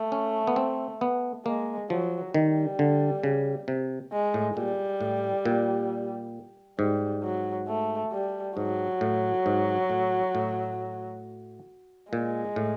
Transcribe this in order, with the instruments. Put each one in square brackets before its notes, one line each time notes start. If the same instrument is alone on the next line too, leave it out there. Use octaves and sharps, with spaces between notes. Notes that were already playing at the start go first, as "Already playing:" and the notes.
Already playing: [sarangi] A3
[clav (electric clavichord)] C#4
B3
C4
B3
[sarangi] G#3 [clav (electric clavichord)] A#3
[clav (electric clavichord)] F3 [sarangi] F#3
[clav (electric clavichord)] D#3 [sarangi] G3
[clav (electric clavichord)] D3
C#3
C3
[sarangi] G#3
[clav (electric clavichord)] A2
[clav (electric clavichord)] A#2 [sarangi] G3
[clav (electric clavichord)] A2
A#2
[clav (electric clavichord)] G#2 [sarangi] G3
[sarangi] F#3
A3
G3
[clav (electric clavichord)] G#2 [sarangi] F#3
[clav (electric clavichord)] A2
G#2
A2
A2
[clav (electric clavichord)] A#2 [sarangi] G#3
[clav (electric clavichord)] A2